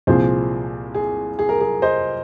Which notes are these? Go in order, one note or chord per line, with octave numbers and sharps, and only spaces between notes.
C2 A#2 F3 G#4 C5
G#4
G#4
A#4
G#4
C5 D#5